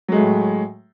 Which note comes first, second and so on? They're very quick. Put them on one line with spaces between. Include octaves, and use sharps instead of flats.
F#3 G#3 A3 A2